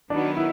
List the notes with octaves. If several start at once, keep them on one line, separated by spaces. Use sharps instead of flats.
D#3 F#3 B3 D4
E4